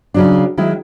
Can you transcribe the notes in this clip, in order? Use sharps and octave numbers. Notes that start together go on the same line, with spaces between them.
C#3 F#3 D4
D#3 F#3 G#3 E4